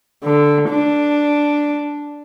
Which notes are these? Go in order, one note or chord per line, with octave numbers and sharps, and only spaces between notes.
D3
D4